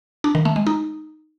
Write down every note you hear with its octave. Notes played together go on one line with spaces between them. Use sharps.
D4
D#3
A3
G#3
D#4